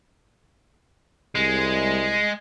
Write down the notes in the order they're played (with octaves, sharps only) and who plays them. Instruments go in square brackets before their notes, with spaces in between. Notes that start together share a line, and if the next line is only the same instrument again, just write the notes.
[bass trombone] C2 [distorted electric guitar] G#3